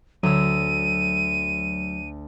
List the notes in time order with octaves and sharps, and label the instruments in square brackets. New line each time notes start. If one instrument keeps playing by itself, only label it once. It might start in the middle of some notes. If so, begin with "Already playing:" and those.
[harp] D2 E6 [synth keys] F#3 [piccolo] D#7